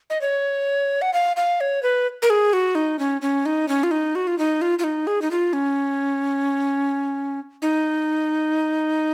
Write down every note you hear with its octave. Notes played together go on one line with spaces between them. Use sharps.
D#5
C#5
F#5
F5
F5
C#5
B4
A#4
G#4
F#4
D#4
C#4
C#4
D#4
C#4
F4
D#4
F#4
F4
D#4
F4
F4
D#4
G#4
D#4
F4
C#4
D#4